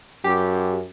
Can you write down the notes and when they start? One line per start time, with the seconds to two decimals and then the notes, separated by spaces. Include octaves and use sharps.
0.24 F#2 G4